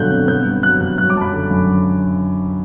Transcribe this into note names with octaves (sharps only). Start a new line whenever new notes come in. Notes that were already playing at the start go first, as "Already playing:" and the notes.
Already playing: G2 B2 D3 F#3 F#6 G6
C4
B3 G6
G2
F#3 F#6
G2
F#3 F#6
D6
F#2 A5
B5
D3
F#2